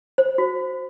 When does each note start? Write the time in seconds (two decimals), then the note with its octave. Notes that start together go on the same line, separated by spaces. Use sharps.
0.18 C5
0.38 F#4